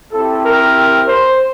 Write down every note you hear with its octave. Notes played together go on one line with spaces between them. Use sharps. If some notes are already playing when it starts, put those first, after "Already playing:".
C4 E4 G4 A4
A#4
C5